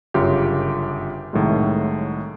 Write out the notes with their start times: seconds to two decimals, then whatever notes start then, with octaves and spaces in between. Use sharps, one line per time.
0.14 G1 F#2 C#3 F4 G4
1.33 C2 A2 D#3 F#3 G#3